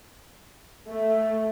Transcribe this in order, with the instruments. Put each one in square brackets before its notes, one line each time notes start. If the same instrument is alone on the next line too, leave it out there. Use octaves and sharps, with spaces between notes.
[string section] A3 [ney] E5